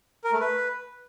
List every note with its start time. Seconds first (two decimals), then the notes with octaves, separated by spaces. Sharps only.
0.24 A#4
0.32 A3
0.40 B4